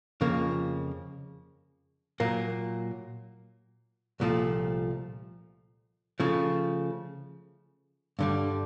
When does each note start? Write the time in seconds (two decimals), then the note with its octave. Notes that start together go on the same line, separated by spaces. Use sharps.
0.21 F2 C#3 F3 A#3
2.20 A#2 F#3 A#3
4.20 C2 A#2 F3 A3
6.20 C#3 F3 A3
8.19 G2 D3 G3